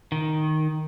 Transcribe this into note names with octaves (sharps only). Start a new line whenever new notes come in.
D#3